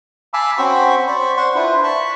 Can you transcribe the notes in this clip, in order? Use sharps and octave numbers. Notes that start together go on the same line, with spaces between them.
F5 G#5 A5 B5 D6 E6
C4 C#4 F#4 C5 B5 C#6
C5 D5 B5 C#6
C5 F#5 C6 C#6
D4 E4 F4 B4 C5
A5 B5 C#6